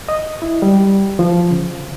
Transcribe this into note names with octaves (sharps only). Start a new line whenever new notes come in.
D#5
E4
G3
F3
C#3